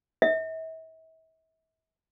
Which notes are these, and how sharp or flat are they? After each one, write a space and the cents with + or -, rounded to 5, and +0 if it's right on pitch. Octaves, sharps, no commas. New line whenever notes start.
E5 -40